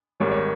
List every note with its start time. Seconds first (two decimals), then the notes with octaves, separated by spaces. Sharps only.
0.20 G#1 G#2 D#3 G3 A#3 C#5
0.31 C#5